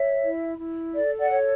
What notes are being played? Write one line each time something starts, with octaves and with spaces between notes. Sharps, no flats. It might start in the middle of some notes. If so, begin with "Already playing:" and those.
Already playing: C#5 E5
E4
E4
A4 D5
D5 F#5
C#5